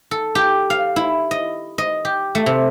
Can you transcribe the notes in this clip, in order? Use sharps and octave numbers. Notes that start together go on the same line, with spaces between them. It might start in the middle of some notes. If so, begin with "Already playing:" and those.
A4
G4
F5
E4
D#5
D#5
G4
A3
C3